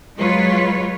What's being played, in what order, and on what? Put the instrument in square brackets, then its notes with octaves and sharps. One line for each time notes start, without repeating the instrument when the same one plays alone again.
[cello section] F#3 G#3 F4 B4 C#5